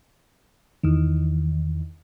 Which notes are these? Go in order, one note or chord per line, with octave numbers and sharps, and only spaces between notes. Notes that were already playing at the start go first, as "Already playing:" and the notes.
E2 D#3